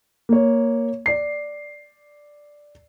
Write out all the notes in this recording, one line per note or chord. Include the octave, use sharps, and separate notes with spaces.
A#3 C#5
D5 C7